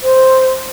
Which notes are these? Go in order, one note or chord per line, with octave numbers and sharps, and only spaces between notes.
C5